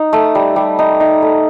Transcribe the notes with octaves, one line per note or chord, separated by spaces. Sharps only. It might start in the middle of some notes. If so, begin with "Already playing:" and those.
Already playing: D#4
A3
G3
G3
D#4
D#4
A3